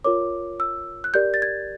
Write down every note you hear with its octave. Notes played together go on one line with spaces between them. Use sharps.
F4 A#4 C#5 D6
E6
F#6
G4 A#4 D5 G6
A6
G#6